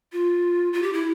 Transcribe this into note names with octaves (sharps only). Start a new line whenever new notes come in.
F4
F4
G4
E4